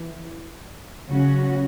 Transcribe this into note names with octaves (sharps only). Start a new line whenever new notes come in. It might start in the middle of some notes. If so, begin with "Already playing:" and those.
Already playing: E3
C#3 F#3 C#4 F#4